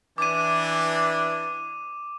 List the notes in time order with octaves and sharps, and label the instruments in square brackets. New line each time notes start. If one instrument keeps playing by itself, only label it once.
[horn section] E3 D4 [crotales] D6 D#7